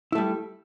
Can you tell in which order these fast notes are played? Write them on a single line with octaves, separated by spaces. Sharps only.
E4 A3 G3